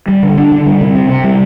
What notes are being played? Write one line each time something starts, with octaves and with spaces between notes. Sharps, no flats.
G3
D3
D4
D3
G3
C3
C4
C3
G3